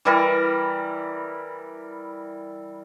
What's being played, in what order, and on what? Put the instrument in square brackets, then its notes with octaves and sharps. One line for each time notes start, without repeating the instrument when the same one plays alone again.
[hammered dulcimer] E3 G3 E4 A#4